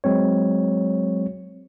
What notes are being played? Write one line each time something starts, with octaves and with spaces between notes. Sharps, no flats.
F#3 G#3 C4 C#5